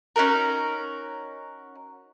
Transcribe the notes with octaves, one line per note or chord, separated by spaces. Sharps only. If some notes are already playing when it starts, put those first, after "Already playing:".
C#4 D#4 F#4 A#4